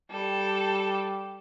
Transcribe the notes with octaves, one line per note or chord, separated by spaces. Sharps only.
G3 A4